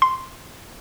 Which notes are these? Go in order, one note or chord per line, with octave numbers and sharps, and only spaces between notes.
C6